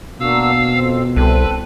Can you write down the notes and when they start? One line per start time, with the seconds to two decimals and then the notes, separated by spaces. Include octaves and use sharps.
0.20 B2 A#3 D4 F#4 F5 E6
0.71 F2 C4
1.16 C2 C4 A4 B4